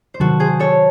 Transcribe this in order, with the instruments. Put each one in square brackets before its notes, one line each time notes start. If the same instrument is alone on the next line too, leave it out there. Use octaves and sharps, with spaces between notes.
[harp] C5
[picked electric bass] C3 D#3 F#3 [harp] F#4 A4
[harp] G#4 C5
A4 C#5